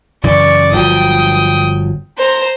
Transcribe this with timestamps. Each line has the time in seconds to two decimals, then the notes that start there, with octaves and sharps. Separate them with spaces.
0.24 F#2 C#3 E3 D5 C#6
0.72 G1 F3 F#3 G5 D#6
2.18 C5 A#5